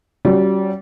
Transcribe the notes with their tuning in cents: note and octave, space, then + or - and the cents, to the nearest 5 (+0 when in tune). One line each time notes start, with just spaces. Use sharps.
G3 -25 C#4 +0 F#4 -35